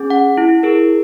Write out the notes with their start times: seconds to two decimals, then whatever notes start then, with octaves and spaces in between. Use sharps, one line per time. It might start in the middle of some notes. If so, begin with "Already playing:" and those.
Already playing: C#4 G#4
0.10 F#5
0.37 E4
0.63 G#4 A#4